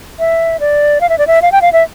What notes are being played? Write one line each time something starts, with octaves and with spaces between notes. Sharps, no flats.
E5
D5
F5
E5
D5
E5
F5
G5
F5
E5